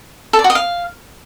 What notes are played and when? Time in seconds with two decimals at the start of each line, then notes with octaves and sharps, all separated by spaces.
0.33 A4
0.39 D5
0.44 F#4
0.50 D#5
0.55 F5